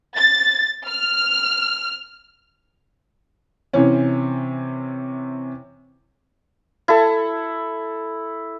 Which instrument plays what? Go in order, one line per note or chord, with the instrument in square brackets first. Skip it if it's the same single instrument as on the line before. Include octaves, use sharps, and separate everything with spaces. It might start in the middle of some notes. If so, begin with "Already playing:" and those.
[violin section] A6
F6
[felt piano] C3 E3 C#4
[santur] E4 A4